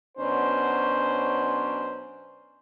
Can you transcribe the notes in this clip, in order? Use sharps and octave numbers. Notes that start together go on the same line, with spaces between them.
B2 F#3 C#4 D4 C5